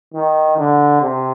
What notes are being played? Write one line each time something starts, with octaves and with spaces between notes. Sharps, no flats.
D#3
D3
C3